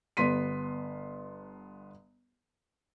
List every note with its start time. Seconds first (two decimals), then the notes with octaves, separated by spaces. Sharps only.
0.17 G1 B3 C6 B6 D#7